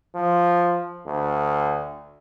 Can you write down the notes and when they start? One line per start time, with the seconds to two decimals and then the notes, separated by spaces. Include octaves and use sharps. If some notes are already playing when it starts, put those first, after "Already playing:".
0.15 F3
1.06 D2